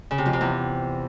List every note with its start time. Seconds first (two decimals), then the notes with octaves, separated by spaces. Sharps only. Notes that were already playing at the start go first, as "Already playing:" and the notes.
0.11 C#3
0.18 C3
0.26 F2
0.33 C3
0.41 E2